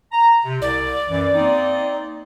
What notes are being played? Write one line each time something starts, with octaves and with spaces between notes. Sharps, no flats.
A#5
C3
C2 D5
F#2 E3
A#3 C4 D#4